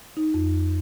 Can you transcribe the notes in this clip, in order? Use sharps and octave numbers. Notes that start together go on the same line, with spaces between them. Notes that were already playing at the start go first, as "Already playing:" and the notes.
D#4
F2